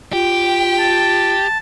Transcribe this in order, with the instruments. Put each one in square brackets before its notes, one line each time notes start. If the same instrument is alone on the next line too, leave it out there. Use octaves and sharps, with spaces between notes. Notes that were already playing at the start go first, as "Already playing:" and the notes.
[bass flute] F4 [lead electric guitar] G4 [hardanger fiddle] G5
[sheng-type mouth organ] A5